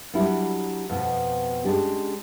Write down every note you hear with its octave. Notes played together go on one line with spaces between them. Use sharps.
F#3 G3 D4 E4
F2 B2 B3
G#3 C#4 D4 G4